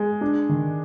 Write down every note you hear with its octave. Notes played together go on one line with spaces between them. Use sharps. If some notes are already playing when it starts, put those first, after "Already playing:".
Already playing: G#3
D4
D#3